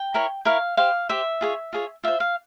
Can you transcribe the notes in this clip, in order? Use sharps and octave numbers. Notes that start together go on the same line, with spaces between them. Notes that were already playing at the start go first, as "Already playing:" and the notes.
Already playing: G5
E4 A#4 C#5
E4 A#4 C#5 F5
G4 C5 F5
G4 C5 E5
F4 G#4 C#5
F4 G#4 C#5
F4 C5 E5
F5